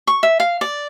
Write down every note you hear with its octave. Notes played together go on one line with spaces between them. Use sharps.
C#6
E5
F5
D5